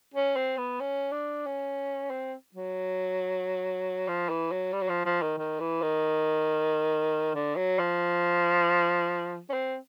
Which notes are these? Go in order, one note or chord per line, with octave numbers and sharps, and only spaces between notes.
C#4
C4
B3
C#4
D4
C#4
C4
F#3
F3
E3
F#3
G3
F#3
F3
F3
D#3
D#3
E3
D#3
D3
F#3
F3
C#4
C4